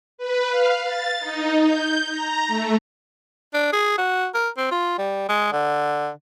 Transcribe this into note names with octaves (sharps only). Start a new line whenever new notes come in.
B4
F5
A6
D#4
G6
A#5
A3
D4
G#4
F#4
A#4
C4
F4
G3
G#3
D3